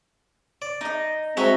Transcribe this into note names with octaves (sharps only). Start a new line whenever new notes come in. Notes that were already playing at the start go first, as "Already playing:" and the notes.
D5
D#4 D#5
G#3 C4 F#4 E5 G#5 A#5